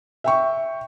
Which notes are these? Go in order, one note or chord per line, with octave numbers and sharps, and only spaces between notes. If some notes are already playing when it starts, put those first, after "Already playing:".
E5 G5 C#6